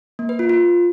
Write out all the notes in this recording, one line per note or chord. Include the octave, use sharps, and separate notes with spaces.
A#3
B4
F4
F4